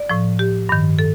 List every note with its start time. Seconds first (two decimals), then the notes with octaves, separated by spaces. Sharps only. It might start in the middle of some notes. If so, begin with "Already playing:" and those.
Already playing: D5
0.09 A2 F3
0.39 G4
0.69 G2 D#3
0.99 A4